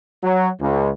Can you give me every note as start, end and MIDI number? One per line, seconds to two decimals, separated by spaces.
0.23 0.49 54
0.61 0.90 37